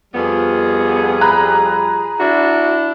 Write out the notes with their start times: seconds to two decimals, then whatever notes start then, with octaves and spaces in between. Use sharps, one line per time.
0.14 F2 G3 B3 G#4
1.21 A#5 B5 F#6
2.19 D4 E4 F#4